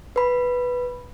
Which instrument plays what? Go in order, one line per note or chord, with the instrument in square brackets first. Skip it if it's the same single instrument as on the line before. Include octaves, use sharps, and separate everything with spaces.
[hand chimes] B4 B5